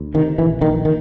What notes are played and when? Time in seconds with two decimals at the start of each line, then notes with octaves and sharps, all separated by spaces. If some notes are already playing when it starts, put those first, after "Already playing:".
Already playing: D2
0.14 C3 D#3
0.38 A#1 E3
0.61 A#1 D#3
0.85 D#3